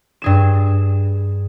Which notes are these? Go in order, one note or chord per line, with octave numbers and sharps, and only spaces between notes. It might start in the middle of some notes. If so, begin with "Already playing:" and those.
G2 G#4 E7